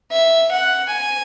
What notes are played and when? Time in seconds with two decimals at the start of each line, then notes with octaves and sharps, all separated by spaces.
0.12 E5
0.52 F#5
0.93 G#5